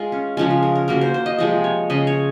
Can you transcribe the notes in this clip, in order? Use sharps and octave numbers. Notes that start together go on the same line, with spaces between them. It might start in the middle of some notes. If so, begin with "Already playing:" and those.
Already playing: G#3 F4
C#4
C#3 F3 G#3 C#4
C#4
A#4
A#4
C#3 F#3 A#3 A#4
C5
C5
D#5
C3 F3 G#3 D#5
C#5
C#3 G#3 D#5
C#5